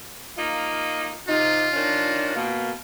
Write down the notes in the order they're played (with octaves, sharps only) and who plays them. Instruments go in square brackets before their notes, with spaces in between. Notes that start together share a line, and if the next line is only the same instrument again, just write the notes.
[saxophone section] A#3 D#4 F4
[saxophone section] C3 D#4 [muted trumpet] F4
[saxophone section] D#3 C#4 D4
B2 A#3